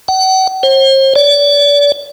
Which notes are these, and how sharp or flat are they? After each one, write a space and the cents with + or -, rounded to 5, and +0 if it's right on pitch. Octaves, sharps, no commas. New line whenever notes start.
F#5 +40
C5 +40
D5 -35